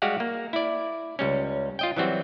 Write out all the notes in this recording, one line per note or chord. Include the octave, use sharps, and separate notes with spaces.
G3 G#3 F#4 G4 F5 F#5
A#3
E4 D5
C#2 G3 C#4
F4 D#5 G5
E3 F#3 G3 C4 F#4